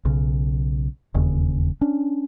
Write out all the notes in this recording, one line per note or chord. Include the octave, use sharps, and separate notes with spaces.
B1 C#3
E1 D#2 C#3
C#4 D4